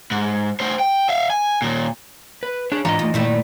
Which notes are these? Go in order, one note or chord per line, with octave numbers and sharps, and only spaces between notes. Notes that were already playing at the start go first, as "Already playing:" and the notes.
G#2
A3 C5
G5
E5 F5
G#5
D#2 A#2
B4
D4 G#4 C#5
G#2 E3 D4 F4 D#5 A#5
A3 D#4 F4
A#2 D#3 G3 A3 E4